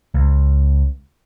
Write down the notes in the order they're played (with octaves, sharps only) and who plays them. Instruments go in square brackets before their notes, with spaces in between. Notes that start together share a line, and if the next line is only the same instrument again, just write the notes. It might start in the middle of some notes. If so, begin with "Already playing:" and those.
[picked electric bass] C#2